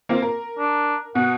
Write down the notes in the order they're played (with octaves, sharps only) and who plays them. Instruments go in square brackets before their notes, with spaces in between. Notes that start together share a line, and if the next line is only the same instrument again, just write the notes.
[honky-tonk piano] A#3 C4 F4
A#4
[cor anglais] D4
[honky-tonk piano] B2 [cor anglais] F#5